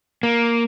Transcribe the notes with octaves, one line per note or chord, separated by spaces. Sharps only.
A#3